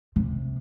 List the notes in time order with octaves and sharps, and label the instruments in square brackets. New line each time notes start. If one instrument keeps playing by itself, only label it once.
[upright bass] C3